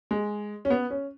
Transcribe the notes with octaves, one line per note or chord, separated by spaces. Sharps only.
G#3
C#4
B3
C#4